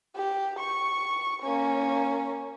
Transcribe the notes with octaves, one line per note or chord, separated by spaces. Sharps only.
G4
C#6
A#3 C#4